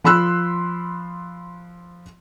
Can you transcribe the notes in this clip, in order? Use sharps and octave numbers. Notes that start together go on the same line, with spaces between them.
F3 B5 C6 E6 F#6